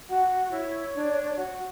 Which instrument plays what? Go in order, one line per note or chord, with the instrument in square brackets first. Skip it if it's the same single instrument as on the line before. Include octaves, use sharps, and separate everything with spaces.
[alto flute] F#4 [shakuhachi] F#5
[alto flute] E4 [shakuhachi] C#5
[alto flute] D4
F#4